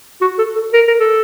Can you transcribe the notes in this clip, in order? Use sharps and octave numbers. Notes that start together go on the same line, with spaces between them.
F#4
A4
A4
A#4
A#4
A4